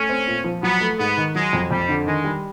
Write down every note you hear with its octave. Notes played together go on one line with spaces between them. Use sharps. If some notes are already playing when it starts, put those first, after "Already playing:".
Already playing: A3 C#4
C4
A#2
F3
F#3 B3
A3
G#2 B3
D#3
F#3 G#3
F2
F2 G3
D3
D#3 G#3
G3